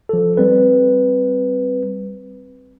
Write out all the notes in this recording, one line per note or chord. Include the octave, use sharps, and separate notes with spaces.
F3 A4
G3 C4 B4